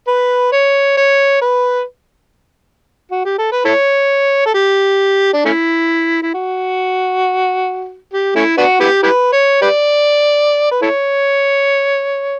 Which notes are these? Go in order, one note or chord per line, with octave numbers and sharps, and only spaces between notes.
B4
C#5
C#5
B4
F#4
G4
A4
B4
E4 A4 C#5
A4
G4
D4
A3 C#4 E4
E4
F#4
G4
A3 C#4 E4
B3 D4 F#4
B3 E4 G4
E4 G4 B4
C#5
G4 B4 D5
B4
E4 A4 C#5